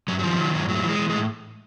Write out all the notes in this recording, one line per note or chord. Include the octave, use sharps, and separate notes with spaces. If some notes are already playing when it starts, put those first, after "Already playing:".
G2 F#3
F#3
D#3 F3
D#3 F#3
G2 F#3
A2 F#3
E3
G#3
E3
G#3
A2